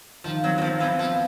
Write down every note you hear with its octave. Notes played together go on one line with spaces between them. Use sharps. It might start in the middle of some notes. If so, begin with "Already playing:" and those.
D#3 F3
F#3 C4
F#3
F3 C4
E3 B3
F3 B3